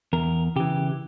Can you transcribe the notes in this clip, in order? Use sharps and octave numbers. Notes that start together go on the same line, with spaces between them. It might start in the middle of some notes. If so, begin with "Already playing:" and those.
E2 A#4
C#3 E3 G4